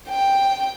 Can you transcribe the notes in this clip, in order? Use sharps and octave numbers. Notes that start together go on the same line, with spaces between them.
G5